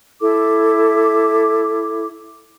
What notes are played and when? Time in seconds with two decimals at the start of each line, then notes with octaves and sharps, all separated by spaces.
0.21 E4 A4 D6